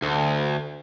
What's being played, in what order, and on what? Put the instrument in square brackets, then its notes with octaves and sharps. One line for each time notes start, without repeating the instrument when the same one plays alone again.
[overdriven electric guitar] D2